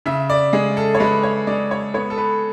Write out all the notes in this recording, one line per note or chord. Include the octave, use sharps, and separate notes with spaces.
C#3 E5
D5
G#3 G#4
A4
C#5
G#3 B4
C#5
G#3 D5
C#5
B3 C#5
A4
B4